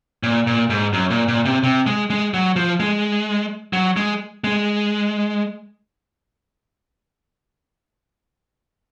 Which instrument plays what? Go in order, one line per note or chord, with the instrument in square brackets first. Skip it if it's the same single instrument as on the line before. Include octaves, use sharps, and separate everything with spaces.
[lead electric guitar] A#2
A#2
G#2
F#2
A#2
A#2
C3
C3
G#3
G#3
F#3
F3
G#3
F#3
G#3
G#3